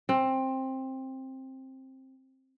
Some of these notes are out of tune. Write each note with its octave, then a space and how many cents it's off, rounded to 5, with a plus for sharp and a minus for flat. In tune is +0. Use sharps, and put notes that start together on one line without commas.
C4 +15